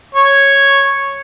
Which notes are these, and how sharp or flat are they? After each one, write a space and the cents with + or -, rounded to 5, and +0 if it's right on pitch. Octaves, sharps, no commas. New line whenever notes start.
C#5 -5